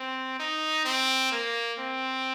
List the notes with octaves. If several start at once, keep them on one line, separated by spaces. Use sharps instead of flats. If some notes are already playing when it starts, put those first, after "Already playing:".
Already playing: C4
D#4
C4
A#3
C4